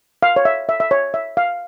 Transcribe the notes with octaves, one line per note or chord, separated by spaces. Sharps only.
F5
C#5
E5
E5
E5
C#5
E5
F5